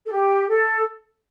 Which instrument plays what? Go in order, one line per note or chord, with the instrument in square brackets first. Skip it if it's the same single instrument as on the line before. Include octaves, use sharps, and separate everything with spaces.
[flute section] A4
G4
A4